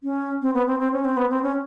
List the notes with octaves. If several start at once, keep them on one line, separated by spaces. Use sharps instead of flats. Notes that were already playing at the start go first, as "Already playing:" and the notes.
C#4
C4
B3
C4
C4
C#4
C4
B3
C4
C#4